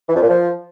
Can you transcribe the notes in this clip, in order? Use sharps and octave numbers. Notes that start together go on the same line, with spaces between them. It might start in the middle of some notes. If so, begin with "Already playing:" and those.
E3
F2
A#2
F3